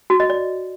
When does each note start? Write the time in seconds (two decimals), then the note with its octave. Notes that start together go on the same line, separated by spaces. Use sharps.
0.10 F#4
0.20 D#5
0.30 D5